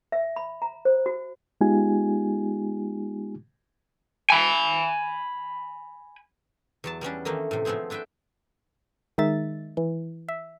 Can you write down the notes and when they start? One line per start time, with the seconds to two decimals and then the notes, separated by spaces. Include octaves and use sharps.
0.12 E5
0.36 B5
0.62 A#5
0.85 C5
1.06 F#4
1.61 G#3 B3 D#4 F4 G4 G#5
4.30 G#5 B5
6.84 E2 F#3 A5
7.01 G3 B3 C#4 D4
7.25 D#3 E3 A3 A#3 D#4
7.51 A2 C3
7.65 F3 A3 B3 C4 G#4
7.90 D4 E4 B4 E5 G5
9.18 D#3 G#3 D#4 E5 A6
9.77 E3
10.28 E5